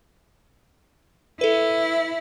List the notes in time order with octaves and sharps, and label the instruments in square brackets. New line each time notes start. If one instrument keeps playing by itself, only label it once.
[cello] E4 [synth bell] A4 B4